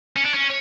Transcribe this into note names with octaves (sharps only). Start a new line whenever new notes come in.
C#4
D4
C#4